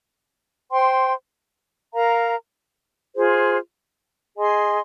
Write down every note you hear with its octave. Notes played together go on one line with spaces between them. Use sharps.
C5 G5 C6
A#4 F5 A#5
F4 G#4 C5
G#4 D#5 G#5 C6